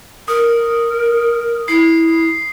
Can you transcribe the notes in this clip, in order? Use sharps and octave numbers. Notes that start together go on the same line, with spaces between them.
A#4 D#6
E4 C7